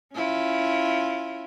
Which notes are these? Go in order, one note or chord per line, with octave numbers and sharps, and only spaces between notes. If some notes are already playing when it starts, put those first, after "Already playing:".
C#4 E4 F4